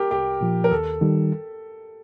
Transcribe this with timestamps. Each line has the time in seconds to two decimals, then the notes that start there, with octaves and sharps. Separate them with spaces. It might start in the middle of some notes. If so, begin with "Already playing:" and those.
Already playing: G4 A#4
0.11 C2 G4
0.41 A#2 F3
0.64 A#4
0.71 D#2 A4
1.01 D#3 G3